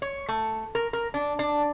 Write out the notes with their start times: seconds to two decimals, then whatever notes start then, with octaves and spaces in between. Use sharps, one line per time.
0.02 C#5
0.28 A3
0.75 A#4
0.93 A#4
1.14 D4
1.39 D4